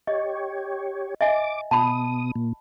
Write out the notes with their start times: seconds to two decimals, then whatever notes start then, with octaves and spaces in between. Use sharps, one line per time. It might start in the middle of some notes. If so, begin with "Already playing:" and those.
0.07 G4 C#5 D#5
1.21 D#5 E5 G#5 D6
1.71 B2 A5 B5 D#6
2.35 A#2